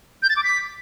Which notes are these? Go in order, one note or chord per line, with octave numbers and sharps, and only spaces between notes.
G6
A6
D6
B6